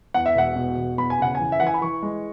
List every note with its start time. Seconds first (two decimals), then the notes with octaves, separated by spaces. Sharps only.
0.14 E2 F#5
0.26 E5
0.35 E1 F#5
0.56 B2
0.77 E1
0.98 E2 B5
1.10 G#5
1.19 C#3 F#5
1.35 E3 G#5
1.52 E5
1.60 E3 F#5
1.67 G#5
1.74 B5
1.81 E3 C#6
2.02 G#3